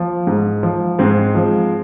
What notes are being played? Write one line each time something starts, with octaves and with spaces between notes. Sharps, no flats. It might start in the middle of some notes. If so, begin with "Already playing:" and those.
Already playing: F3 A#3
G#2
F3
G#2 G#3 C4
F3